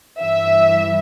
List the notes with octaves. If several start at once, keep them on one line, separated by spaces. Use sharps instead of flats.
G2 E3 E5